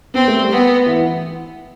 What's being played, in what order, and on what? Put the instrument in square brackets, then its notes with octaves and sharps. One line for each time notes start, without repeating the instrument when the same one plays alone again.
[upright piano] B3 [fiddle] C4
[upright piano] A3
G3
[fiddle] B3
[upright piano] E3